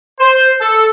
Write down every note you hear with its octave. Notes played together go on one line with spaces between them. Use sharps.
C5
A4